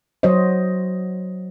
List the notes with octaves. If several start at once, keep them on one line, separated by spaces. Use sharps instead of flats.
F#3 F#4 C5 C#5 D#5